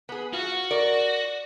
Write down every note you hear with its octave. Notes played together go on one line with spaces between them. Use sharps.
B3 G#4
F4 F#4
A#4 D5